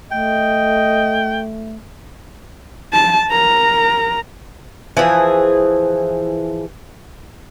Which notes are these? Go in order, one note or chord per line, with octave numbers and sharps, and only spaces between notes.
A3 D#5 G5
A5
A#4 A#5
E3 F3 G#4